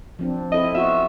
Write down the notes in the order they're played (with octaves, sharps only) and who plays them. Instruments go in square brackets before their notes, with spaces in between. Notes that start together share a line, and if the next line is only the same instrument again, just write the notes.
[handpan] F3 C4 D4
[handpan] C4 E4 A4 [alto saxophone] D#5
[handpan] B3 F4 F#4 [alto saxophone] E5